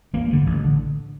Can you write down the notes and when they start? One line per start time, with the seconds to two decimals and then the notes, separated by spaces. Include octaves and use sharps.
0.14 A1 A#3
0.30 G2 D3
0.47 A1
0.64 D3